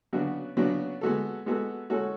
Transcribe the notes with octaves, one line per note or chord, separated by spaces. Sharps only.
C#3 F#3 B3 D4 F#4
C#3 F#3 B3 D4 F#4
G#3 B3 F#4 A4
G#3 B3 F#4 A4
G#3 C#4 F#4 A4